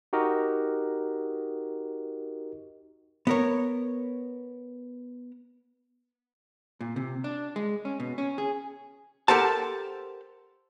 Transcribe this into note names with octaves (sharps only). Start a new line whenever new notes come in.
D#4 F#4 G4 A#4 D#5
B3 A#4 C#5
A#2
C3
D4
G#3
C#4
B2
C#4
G#4
G4 A4 A#4 C5 F#5 A5